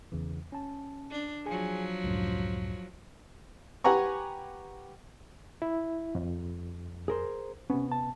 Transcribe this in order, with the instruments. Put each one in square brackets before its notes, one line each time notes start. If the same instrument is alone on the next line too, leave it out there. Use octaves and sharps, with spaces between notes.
[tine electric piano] E2 C#3 E3
C#4 A5
[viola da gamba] D4
[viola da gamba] F3 F#3 [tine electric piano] G#4 G#5
[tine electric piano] C#2 F#2 A2
[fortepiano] G4 B4 F#5 G#5 A#5 C#6
[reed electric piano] E4
F2
[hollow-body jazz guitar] G#4 A#4 C5
[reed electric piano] C3 B3 [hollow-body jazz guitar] C#4
[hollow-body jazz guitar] A5